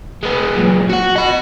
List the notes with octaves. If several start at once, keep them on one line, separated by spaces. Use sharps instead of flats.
G#3 B3
F#2 A#2
F#4 F#5
D#5 B5